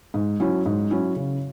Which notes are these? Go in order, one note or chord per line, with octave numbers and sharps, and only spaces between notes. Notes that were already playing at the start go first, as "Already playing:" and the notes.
G#2
F#3 C#4 E4
G#2
F#3 C#4 E4
C#3